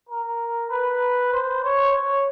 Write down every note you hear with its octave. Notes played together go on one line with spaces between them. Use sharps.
A#4
B4
C5
C#5
C#5